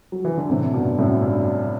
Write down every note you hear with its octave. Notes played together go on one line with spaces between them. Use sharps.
F#3
E3
D3
A2 C3
G2 B2
F#2 A2
G2